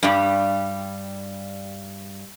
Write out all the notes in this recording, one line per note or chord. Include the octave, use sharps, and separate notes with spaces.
G2 G3